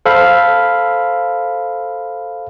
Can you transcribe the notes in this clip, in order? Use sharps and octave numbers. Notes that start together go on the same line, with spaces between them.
A4 C5 F5 B5